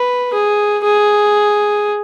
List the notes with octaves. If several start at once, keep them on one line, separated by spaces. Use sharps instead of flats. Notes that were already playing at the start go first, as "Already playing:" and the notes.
Already playing: B4
G#4
G#4